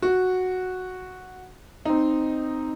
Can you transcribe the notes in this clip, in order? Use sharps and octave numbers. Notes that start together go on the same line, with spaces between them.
F#4
C4 D#4